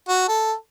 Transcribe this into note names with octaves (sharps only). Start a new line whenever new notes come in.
F#4
A4